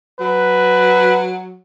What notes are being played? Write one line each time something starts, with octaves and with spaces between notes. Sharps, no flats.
F#3 B4